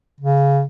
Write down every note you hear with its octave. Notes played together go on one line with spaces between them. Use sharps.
C#3